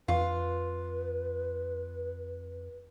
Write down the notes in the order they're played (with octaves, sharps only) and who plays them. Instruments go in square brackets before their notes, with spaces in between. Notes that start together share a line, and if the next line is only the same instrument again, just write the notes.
[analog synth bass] F2 [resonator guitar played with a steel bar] F4 [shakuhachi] B4